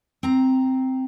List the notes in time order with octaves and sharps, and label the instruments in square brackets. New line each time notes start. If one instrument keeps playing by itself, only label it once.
[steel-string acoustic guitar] C4 A#5